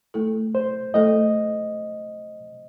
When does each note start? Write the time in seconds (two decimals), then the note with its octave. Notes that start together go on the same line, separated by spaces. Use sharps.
0.14 A3 E4 A4
0.55 C5
0.94 A3 E4 A4 D#5